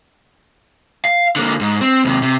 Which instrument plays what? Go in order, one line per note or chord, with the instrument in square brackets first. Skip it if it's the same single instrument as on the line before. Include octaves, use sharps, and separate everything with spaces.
[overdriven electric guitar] F5
D3 A#3
G#2
C4
D#2 C3
C3